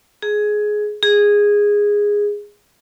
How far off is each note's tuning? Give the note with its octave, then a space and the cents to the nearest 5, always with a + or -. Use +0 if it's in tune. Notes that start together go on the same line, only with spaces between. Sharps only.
G#4 +15
G#4 -10